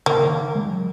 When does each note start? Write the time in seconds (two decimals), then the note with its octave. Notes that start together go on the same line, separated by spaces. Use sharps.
0.06 C#3 A#3
0.22 D#3
0.55 G#3
0.71 F#3